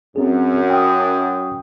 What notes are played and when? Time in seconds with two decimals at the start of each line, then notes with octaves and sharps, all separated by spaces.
0.16 F#2 C4 G#4
0.70 G5 D#6